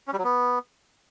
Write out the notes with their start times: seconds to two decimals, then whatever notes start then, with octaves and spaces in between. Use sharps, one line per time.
0.08 C#4
0.13 G3
0.19 F#3
0.24 B3